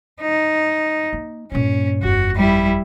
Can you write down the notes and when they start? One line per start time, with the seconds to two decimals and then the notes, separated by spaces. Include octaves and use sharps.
0.21 D#4
1.13 A#3
1.52 G2 A#2 C#4
2.03 G1 F2 F#4
2.36 G3 E4